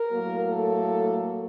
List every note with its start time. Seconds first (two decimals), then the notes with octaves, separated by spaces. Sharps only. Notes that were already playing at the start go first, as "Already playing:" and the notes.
Already playing: A#4
0.11 A2 F#3 A#3
0.48 A4